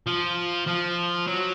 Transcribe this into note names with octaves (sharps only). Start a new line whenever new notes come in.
F3
F3
F#3